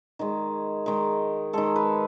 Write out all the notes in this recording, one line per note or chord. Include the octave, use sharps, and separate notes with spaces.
D#3 G#3
D#3 G#3
D#3 G#3 A4
B4